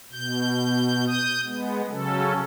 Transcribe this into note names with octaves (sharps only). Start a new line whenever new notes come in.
B2 G6
D#6 G6
G#3 B3
C#3 F#3 C#4 A4